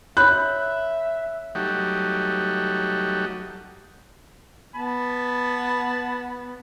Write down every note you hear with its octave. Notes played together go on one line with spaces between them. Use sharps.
C#5 E5 B5 F#6 G6
F#3 G3 A3 D#4 F#4 G4
B3 A5 B5